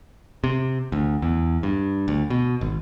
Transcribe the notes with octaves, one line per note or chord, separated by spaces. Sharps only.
C3
D2
E2
G2
D2
B2
G#1